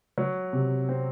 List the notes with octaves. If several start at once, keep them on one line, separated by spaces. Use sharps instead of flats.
F#3
C3
C4